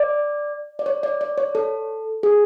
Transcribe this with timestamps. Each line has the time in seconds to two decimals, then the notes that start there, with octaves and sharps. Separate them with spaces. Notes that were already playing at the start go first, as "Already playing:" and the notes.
Already playing: D5
0.79 D5
0.86 C#5
1.03 D5
1.21 D5
1.38 C#5
1.55 A4
2.23 G#4